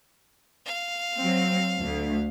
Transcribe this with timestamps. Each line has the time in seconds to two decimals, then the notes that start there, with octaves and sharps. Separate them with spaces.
0.65 F5
1.17 F#3 C4
1.81 D2